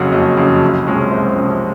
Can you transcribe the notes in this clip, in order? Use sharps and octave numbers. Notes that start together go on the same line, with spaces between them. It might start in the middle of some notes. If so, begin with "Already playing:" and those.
Already playing: F#1 F2 C#3 F#3 F#5
F#1 D#5
F2 C#3 F#3
C2
C3 F3 G#3 C#4
C2 C5
C3 F3 G#3 C#4